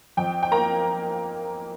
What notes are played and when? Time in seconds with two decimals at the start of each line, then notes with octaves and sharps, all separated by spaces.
0.17 F2 G5
0.43 G5
0.51 A#3 A#5